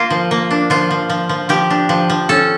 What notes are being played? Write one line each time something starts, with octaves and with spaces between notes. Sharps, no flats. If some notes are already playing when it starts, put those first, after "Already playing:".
Already playing: A#3 F4
F3
A#3
D4
F3 F4
F3
F3
F3
F3 G4
D4
F3
F3
C#4 A4